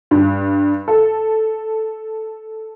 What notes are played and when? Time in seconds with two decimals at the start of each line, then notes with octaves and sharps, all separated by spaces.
0.11 G2
0.88 A4